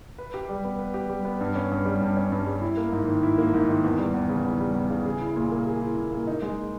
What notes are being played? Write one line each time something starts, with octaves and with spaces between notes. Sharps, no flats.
B4
G4
G3
B3
B4
G4
G3
B3
G2
C#4
G2
G3
G2
C#4
G2
G3
E4
A#3
G#2
D#3
E4
A#3
G#2
D#3
E2
G3
E2
C#3
E2
G3
E2
C#3
G#4
E4
A#2
A#3
G#4
E4
A#2
A#3
D#4
G#3